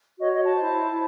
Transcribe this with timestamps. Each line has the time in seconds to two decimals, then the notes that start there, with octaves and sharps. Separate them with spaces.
0.19 F#4 C#5 D#5
0.31 D#5
0.43 A5
0.55 E4 C5
0.92 E4